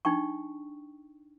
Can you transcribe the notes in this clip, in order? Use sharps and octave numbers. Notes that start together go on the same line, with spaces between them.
D4 D#4 G5 C#6